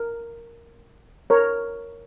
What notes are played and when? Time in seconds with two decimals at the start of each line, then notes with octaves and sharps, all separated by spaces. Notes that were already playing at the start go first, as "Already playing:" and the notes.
Already playing: A#4
1.30 A#4 C#5